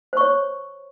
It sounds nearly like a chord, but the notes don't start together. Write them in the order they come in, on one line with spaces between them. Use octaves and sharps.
C5 C#6 C#5